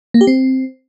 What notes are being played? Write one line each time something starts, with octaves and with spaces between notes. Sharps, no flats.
A#3
G4
C4